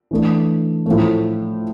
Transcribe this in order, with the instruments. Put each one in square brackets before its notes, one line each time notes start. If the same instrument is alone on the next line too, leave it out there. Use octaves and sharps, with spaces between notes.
[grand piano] E3 A3 D4
A2 F3 A3